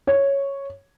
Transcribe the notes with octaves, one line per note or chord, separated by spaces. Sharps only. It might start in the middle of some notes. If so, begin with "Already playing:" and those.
C#5